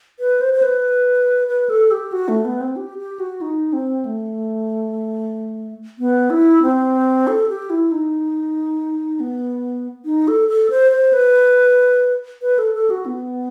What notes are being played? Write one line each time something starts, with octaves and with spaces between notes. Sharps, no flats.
B4
C5
C5
B4
B4
A4
G4
F#4
A3
B3
C4
G4
G4
F#4
D#4
C4
A3
B3
E4
C4
A4
G4
E4
D#4
B3
D#4
A4
A4
C5
C5
B4
B4
A4
A4
F#4
B3